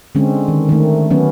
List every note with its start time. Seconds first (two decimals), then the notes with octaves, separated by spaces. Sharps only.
0.15 D3 G#3 C4 C#4
0.48 D#3
0.69 D#3 A3
1.10 F#3 B3 C#4